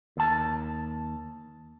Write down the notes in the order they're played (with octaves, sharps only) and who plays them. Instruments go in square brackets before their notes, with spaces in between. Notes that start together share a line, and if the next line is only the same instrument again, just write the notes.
[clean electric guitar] D#2 A5